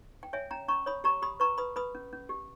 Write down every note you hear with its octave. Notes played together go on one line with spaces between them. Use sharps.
G5
C#5 E5 G#5
C#4 G5 A#5
C#4 A#5 C#6
C#5 B5 D#6
G4 A#5 C#6
G4 B5 D#6
B4 A#5 C#6
B4 B5 D#6
B4 B5 D#6
C#4
C#4
G4